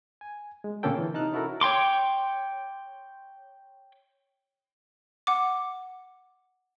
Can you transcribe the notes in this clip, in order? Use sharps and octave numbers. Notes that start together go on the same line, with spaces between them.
G#5
G#3
A#2 D3 A#3 C#4 A4 G5
E3
C3 D#4 A5 F6 F#6
C#4 E4 F#4 A4 A#4
C#5 G5 C6 D6
F#5 D6